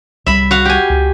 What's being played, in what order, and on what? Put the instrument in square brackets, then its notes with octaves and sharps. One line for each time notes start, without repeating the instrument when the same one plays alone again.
[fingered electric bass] C2 G3 [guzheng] E5 B5
[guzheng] F#4 F5
G4 G#5
[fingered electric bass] C#2